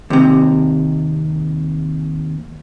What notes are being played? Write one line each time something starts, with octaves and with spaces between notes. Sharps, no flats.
D#2 C3